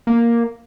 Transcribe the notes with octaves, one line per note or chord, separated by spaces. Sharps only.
A#3